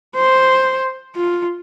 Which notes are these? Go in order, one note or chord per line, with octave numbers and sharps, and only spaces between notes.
C5
F4